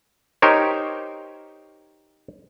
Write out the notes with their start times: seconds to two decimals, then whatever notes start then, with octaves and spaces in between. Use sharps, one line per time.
0.42 D#4 G4 A#4 C5 C#5